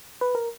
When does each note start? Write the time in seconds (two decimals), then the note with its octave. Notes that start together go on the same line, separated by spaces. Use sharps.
0.21 B4
0.35 A#4